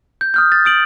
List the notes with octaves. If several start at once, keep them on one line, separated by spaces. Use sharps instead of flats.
G6
D#6 F6 G6
A6
D#6 D7 F#7